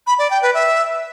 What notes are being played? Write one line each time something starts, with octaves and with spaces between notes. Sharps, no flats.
B5
D5
G5
B4
E5